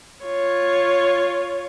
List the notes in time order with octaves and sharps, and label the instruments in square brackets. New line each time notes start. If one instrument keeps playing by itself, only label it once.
[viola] F4 C#5